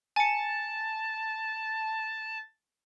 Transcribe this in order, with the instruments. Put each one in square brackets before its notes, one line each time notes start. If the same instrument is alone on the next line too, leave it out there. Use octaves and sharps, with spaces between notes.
[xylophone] G#5 C#7 [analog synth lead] A5